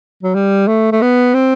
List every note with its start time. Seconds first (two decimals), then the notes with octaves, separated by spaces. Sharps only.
0.23 F#3
0.35 G3
0.68 A3
0.92 A3
1.02 B3
1.34 C4